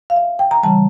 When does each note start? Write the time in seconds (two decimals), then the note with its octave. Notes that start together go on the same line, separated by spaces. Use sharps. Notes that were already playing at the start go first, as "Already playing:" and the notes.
0.10 F5
0.16 E5
0.39 G5
0.51 A#5
0.63 C#3 E3 G3 A5